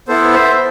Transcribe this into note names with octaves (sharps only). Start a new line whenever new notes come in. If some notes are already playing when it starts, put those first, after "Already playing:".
B3 E4 A4 C5
C5 E5